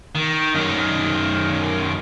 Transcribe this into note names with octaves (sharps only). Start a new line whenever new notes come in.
D#3
F#2 D#3